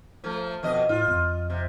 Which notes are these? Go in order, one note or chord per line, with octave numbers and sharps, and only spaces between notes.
F3 A3
F2 B2 D#5
A2 F4
F2
C3